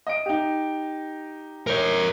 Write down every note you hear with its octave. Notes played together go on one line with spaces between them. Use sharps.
D#5 D7
D#4 G4
A#4 C#5